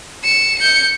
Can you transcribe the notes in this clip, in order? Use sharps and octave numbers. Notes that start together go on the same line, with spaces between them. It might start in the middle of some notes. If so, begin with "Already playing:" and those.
C#7 E7
G6 C#7